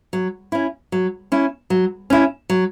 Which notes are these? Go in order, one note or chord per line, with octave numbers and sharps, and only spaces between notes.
F#3
C#4 E4
F#3
C#4 E4
F#3
C#4 E4
F#3